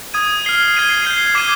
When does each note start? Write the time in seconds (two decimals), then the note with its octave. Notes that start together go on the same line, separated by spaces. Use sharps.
0.14 D#6 G#6 D#7
0.45 F6 C7 G7
0.75 G#6 C7 D#7 G7
1.05 G6 C7 G7
1.35 D6 G#6 C7 D#7 G7